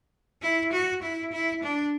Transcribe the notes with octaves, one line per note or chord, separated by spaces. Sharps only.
E4
F#4
E4
E4
D4